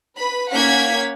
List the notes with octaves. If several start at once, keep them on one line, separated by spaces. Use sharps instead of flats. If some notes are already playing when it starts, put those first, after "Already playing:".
B4 B5
A#3 C#4 F5 F#5 G#6 B6